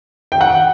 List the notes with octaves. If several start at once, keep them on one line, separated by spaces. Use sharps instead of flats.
G5
F#5